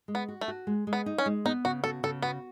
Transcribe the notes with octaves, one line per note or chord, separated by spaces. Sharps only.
G#3
B3
F#4
A3
F#4
G#3
G#3
B3
D#4
C#4
G#3
B3 D#4
C#3 F#4
F#4 A4
C#3 A4
B3 F#4